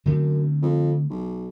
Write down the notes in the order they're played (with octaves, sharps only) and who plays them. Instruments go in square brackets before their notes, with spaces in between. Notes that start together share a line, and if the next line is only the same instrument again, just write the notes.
[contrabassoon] F#2 [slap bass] D3 A3 C4
[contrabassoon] F2
B1